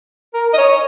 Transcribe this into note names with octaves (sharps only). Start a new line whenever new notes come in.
A#4
D#5
C#5